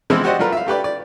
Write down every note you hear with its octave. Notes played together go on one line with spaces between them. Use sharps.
E3 F3 G#3 B3 C4 E4
F#4 G4 C5 D5 D#5 F#5
G3 A3 F4 A#4 B4
E5 F5
A3 G4 B4 D5
D5